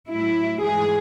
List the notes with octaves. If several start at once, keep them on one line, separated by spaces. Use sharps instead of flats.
A2 F#3 E4
G#2 E3 G#4